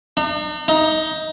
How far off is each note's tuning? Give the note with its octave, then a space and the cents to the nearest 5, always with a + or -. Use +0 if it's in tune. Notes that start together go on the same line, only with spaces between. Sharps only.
D#4 -45
D#4 +15